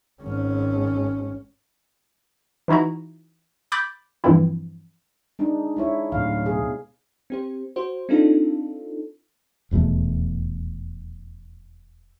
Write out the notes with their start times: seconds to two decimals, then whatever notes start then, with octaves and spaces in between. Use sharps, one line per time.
0.22 G#1 C#4
2.68 E3 D#4 E4 F#4 A#5
3.72 B5 D6 F#6 G6 A6 B6
4.24 G2 A#2 E3 F3 C4 E4
5.39 G#3 D4 D#4
5.77 G#3 E4 C#5
6.12 D2 A2 F5
6.45 B2 G#4
7.30 C4 G4 C5
7.76 F#4 C5
8.09 C4 D4 D#4 F4 A4
9.71 D#1 E2 B2 A3